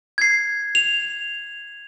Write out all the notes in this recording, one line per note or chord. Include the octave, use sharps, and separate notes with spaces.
G#6 C7
F7